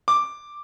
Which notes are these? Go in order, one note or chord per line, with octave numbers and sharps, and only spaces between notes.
D6